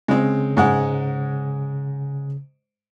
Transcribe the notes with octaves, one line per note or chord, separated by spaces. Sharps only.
C#3 G#3 C4
G#2 C#3 G#3 F#5